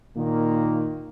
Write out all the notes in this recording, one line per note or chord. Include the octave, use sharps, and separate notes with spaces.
A#2 D#3 A#3